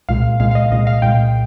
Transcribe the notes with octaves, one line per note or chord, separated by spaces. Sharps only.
C2 A#2 G#3 F5
C2 A#2 G#3 F5
F5
D#5
C2 A#2 G#3 D#5
F5
C2 A#2 G#3 G5